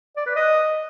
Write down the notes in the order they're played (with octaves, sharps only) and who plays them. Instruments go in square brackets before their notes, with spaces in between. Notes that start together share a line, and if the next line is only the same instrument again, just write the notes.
[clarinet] D5
B4
D#5